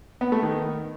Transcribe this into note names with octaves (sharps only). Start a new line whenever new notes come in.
B3
A3
D#3